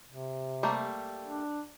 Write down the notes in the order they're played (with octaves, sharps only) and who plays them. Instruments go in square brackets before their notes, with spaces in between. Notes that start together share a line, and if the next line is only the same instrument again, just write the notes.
[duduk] C3
[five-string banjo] G3 A3 A#3
[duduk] D4